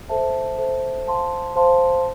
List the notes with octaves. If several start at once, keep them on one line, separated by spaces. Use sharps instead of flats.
A4 C5 E5 A5
A4 C5 E5 A5
C5 F5 A5 C6
C5 F5 A5 C6